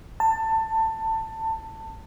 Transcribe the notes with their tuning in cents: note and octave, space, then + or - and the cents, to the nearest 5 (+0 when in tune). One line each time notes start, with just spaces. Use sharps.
A5 +20